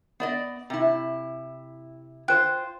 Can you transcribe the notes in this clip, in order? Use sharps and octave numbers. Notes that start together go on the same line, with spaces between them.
B3 D5 D#5
C3 E4
F4 C5 G5 F#6